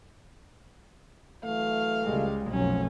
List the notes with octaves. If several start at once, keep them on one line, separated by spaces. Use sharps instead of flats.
E3 F#3 A3 F5
C#2 G3 G#3
F1 B1 F#2 F3 F#3 C#4